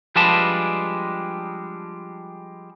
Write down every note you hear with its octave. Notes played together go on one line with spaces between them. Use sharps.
F3 G3 G#3 D4 B4 A5